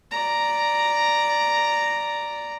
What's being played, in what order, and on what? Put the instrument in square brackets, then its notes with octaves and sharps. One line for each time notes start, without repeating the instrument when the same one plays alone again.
[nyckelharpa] D5 A#5